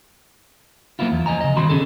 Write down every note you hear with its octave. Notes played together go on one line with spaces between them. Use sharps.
F#3 A#3 B3 E4 F4
E2
F3 D#5 G#5 A#5
C#3 D#5
C2 B2 D#3 F#4 B5 C6
B2 E3 C#4 G#4 A4